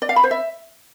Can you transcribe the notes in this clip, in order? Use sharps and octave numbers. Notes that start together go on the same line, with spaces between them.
D5
F5
B5
C5
E5